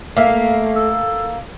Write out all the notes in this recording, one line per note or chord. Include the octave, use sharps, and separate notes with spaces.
A3 A#3 E5 F5
A4